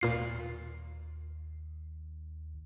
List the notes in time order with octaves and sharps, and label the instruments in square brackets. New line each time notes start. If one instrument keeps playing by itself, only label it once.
[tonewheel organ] D#2 [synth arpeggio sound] A#2 F4 C7